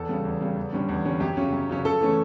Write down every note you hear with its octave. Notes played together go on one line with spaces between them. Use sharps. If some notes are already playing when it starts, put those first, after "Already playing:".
Already playing: E2 A4
C#3 G3
E2
C#3 G3
E2
D3 G3 C#4
E2
D3 G3 C#4
F#2 G4
C#3 F#3 C#4
F#2
C#3 F#3 C#4
C#3 A4
E3 A3 C#4